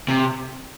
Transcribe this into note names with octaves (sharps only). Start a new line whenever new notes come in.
C3